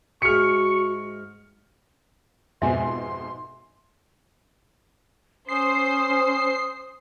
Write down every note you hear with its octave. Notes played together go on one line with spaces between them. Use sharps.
G#2 F#4 G#4 E5 C#6 F6 C#7
F2 G#2 B2 E5 G#5 C6
C#4 C5 D#6 C7